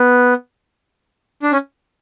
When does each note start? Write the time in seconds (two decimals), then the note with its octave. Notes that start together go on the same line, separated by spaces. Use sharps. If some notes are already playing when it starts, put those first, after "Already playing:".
Already playing: B3
1.43 D4
1.52 C#4